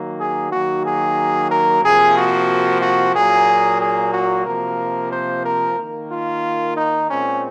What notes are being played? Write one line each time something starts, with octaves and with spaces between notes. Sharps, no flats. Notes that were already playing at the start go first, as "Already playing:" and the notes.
Already playing: D#3 F#3 A#3
G#4
D#3 F#3 A#3 F#4
G#4
A#4
C3 F3 A#3 G#4
F#4
F#4
A#2 F#3 A#3 G#4
G#4
F#4
C3 F3 A#3 A#4
C5
A#4
D#3 A#3
F4
D#4
A#2 G#3 C4 C#4